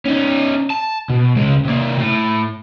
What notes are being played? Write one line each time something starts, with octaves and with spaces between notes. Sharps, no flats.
C#4 D#4
A5
B2
C#2 G#3
C3 A#3
A2